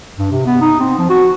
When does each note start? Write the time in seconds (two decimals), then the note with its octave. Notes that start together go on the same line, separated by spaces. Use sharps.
0.18 G2
0.32 C3
0.46 B3
0.61 D#4
0.80 C4
0.98 F3
1.10 F#4